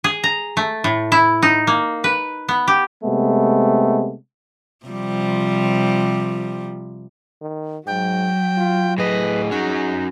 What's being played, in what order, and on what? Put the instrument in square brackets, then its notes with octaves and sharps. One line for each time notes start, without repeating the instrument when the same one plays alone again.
[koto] G#4
A#5
A3
A2
E4
D#4
A#3
B4
B3
G4
[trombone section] C3 G#3 A3 B3
[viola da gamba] C3 F3 G3
[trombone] D#3
[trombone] G#2 [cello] F#3 [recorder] G5
[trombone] F4
[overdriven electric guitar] A2 D#5 [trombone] G#4 [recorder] B4
[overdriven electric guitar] C#4 F#4 [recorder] D#4